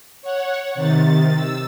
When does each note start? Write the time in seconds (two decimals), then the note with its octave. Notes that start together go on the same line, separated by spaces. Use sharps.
0.22 C#5 F#5
0.75 C3 D#3 A6
1.35 E6